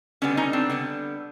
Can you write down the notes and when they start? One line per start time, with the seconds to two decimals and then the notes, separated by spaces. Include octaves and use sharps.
0.22 D3 G3 B3 C#4
0.37 C#4 D#4
0.53 C4 D4
0.69 D3 G3 B3